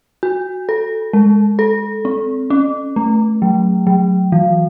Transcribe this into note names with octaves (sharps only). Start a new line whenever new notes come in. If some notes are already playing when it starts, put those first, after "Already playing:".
F#4
A4
G#3
A4
C4
C#4
A3
F#3
F#3
E3